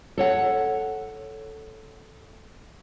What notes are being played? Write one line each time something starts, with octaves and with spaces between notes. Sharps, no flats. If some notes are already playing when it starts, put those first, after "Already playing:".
A4 C#5 F#5